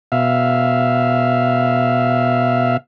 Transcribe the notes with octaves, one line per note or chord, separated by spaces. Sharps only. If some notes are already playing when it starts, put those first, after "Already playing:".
B2 E5 F5